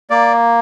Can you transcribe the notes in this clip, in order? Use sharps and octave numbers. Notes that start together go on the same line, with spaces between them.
A#3 D5